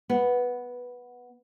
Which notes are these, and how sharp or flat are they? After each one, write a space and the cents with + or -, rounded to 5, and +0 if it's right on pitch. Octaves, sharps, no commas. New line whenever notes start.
B3 -5